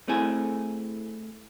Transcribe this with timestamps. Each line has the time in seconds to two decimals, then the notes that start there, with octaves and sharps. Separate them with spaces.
0.08 A3 C4 E4 G#4